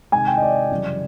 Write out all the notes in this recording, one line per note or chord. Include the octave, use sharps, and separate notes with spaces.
C3 D#3 G#3 G#5
G5
D#5
D5
F#2 C#3 E3 G3